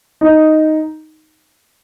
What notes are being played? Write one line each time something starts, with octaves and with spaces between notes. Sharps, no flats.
D#4